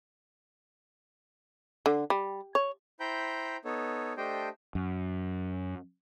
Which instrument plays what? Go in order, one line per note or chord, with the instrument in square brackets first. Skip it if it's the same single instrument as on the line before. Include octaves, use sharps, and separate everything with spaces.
[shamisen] D3
G3
C#5
[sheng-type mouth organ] E4 C5 G5 A#5 B5 G6
B3 D#4 A4 C#5
A3 D4 G4 C5 D#5 G5
[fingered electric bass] F#2